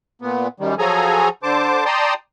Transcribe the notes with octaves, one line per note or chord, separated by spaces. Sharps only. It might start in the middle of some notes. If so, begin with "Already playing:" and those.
A#2 B3
F#2 D#3 G3
F3 F#3 G#4 A4 G#5 A#5
D3 C5 A5 D6
D5 G5 A5 A#5 C6 D#6